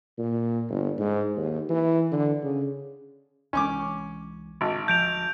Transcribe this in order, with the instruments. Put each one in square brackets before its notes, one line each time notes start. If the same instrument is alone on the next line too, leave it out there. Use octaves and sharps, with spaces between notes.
[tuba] A#2
G1
G#2
D#2
E3
D3
C#3
[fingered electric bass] C2 E3 G#3 [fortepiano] C#4 C#6 D6
[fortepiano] G#1
[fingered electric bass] D1 F3 [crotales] G6 D7 F7